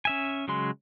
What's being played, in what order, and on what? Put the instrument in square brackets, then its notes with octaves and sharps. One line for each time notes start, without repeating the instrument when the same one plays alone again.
[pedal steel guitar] C#4 E5 G#5
C#3 F#3 G#3 C6